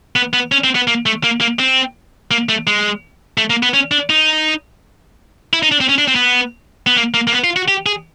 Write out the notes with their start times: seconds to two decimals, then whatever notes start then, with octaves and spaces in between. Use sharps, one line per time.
0.16 B3
0.33 B3
0.52 C#4
0.64 C4
0.75 B3
0.88 A#3
1.06 A3
1.24 A#3
1.41 A#3
1.59 C4
2.31 A#3
2.49 A3
2.67 G#3
3.38 A3
3.50 A#3
3.63 B3
3.74 C#4
3.91 D4
4.10 D#4
5.53 E4
5.63 D#4
5.71 D4
5.80 C4
5.89 C#4
5.98 D4
6.08 C4
6.15 B3
6.87 B3
6.96 A#3
7.14 A#3
7.27 A#3
7.33 B3
7.44 F4
7.56 F#4
7.68 G4
7.86 G#4